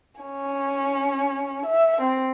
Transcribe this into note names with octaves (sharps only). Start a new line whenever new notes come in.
C#4
E5
C4